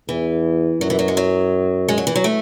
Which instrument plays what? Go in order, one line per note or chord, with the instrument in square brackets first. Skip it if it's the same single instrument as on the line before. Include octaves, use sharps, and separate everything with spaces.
[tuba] E2 [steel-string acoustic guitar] E3
[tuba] F#2 [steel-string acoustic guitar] F#3
[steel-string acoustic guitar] E3
F#3
G#3
F#3
G#3
F#3
E3
F#3
A3